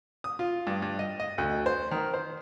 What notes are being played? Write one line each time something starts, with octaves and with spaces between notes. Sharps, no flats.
D#6
F4
G2
G2
D#5
D#5
D2
C5
D#3
C5